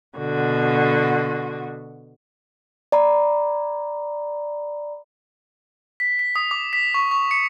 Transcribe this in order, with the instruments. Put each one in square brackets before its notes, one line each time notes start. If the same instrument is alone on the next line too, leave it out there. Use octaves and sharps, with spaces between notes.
[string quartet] B2 D3 F#4
[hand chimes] D5 A#5 B5
[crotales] B6
B6
D#6
D6
B6
C#6
C#6
C#7